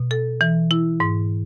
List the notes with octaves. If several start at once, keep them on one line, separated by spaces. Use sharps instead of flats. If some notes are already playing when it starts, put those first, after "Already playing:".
Already playing: B2
A4
E3
E4
G#2